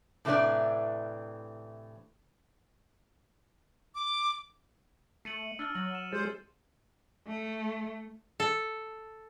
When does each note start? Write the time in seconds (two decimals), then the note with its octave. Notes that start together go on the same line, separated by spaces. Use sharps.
0.25 A2 C3 E3 A3 D4 D5
3.95 D6
5.25 A3 C#7 D#7 F#7
5.59 D4 E6 F6 A6
5.75 F#3 F#7
5.95 E7
6.13 G3 G#3 G#4 C5 A6
7.27 A3
8.40 A4